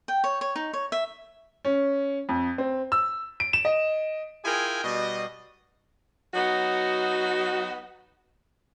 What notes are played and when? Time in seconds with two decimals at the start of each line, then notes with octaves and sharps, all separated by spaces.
0.08 G5
0.24 C#5
0.41 C#5
0.56 D#4
0.73 C#5
0.92 E5
1.65 C#4
2.29 F2
2.58 C4
2.92 E6
3.40 D7
3.53 E7
3.65 D#5
4.45 E4 F4 G#4 A#4 G5 G#5
4.84 B2 G3 D#5
6.34 F#3 B3 D#4 F#4